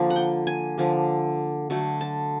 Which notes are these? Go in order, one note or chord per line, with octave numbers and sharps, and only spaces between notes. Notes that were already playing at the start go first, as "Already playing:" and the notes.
Already playing: D3 F3 A#3
F#5
G5
G#5
D3 F3 A#3
D3 F#3 A3
A5